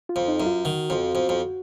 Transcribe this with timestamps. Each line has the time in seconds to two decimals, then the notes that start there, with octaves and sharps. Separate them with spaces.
0.09 F4
0.16 F2
0.28 D#4
0.40 F#2
0.46 F4
0.65 D#3 F#4
0.90 F2
1.15 F2
1.29 F2